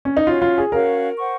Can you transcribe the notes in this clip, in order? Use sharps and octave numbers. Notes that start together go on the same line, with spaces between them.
C#4
D#4
C#4 F4 F#4 C#5 F5
F4
G#4
C#4 F#4 A#4 C#5 F5
C5 F#5 C#6